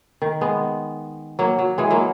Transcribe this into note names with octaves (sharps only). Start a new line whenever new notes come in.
D#3
G#3 B3
F#3 A#3
F#3
E3 G#3
F#3 A#3